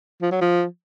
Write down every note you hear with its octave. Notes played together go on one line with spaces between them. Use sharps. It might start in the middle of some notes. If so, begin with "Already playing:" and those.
F3
F#3
F3